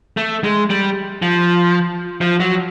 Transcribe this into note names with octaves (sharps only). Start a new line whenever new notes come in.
A3
G#3
G3
F3
F3
F#3